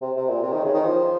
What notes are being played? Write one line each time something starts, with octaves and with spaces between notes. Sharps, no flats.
C3
C3
A#2
C3
D#3
C#3
D#3
F3